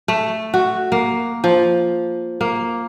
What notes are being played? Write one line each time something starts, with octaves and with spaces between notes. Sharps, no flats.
A3
F#4
A#3
F3
A#3